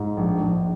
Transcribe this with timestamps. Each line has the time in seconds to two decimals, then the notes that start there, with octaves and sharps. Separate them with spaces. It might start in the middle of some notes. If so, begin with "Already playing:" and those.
Already playing: G#2
0.17 A#1
0.40 A#1